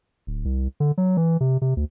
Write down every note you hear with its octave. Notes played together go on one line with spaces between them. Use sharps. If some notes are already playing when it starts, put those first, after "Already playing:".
D1
C2
D3
F#3
E3
C3
C3
D2